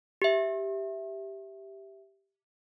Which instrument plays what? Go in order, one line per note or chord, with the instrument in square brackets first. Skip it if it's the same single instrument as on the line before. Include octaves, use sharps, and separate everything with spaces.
[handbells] G4 E5